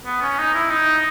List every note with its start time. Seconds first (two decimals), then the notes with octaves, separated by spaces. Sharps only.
0.05 B3
0.22 C#4
0.38 D#4
0.54 E4
0.70 D#4